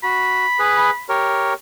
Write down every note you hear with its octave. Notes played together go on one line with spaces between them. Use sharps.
F#4 B5
G#4 B4
G4 A#4 C#5